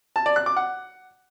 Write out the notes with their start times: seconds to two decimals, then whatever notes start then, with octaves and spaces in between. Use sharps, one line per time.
0.16 A5
0.26 D5
0.36 F#6
0.46 D6
0.56 F#5